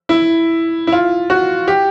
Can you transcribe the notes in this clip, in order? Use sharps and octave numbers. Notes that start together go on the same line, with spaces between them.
E4
E4
F4
F#4
G4